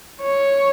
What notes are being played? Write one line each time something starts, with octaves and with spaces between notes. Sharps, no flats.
C#5